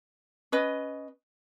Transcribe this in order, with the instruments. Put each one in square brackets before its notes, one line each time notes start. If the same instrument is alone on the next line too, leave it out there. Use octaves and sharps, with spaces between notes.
[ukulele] C#4 B4 D#5